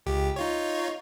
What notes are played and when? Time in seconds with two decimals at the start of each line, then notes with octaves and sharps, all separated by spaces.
0.06 C#2 G4
0.36 D#4 F4 C#5